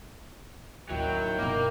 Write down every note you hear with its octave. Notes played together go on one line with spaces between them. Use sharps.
A1 D#2 D#3 F#3 E4 G5
G1 B2 A#3 A#4